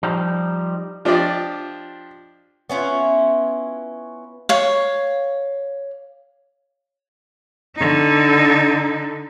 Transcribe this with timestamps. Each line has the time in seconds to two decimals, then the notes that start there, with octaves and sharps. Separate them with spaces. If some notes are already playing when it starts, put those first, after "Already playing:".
0.03 F3 G3 D#4
1.05 F3 D4 F4 G4 D5 D#5
2.70 B3 C#4 E4 F4
4.49 C#5 F5
7.76 D3 D#4